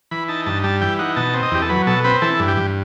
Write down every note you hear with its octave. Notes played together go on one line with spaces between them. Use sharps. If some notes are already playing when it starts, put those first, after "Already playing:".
E3 B5
D#4 A5
G2 A5
G3 A5
E3 G5
D#4 F#5
B2 A5
C4
D#5
E2 G4
A4
F#3 B4
B2 A4
C4 B4
E3 A4
G2
G4
G2